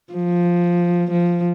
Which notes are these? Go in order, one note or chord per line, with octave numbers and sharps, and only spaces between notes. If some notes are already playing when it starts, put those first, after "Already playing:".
F3
F3